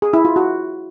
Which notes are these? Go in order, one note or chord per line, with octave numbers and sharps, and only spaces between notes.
G#4
E4
F4
F#4